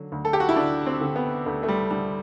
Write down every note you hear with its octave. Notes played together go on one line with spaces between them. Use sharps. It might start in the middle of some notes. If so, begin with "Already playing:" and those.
Already playing: D3 F#3
D2
A4
G4
F#4
E4
D3 D4
C4
D3
B3
D2 A3
A3
G3
D3 G3